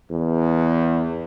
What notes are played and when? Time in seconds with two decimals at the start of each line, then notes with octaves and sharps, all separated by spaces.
0.11 E2